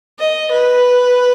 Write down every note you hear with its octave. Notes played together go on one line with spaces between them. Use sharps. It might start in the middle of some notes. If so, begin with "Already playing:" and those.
D#5
B4